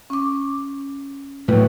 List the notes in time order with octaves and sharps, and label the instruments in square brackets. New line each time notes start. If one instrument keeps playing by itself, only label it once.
[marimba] C#4 D6
[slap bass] A2 F#3 [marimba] B4